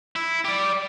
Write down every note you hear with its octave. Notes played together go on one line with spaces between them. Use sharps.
E4
G4 D5